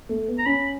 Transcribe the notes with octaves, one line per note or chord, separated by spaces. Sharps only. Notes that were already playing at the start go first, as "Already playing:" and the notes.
A3
B3
A#5
C#4 B5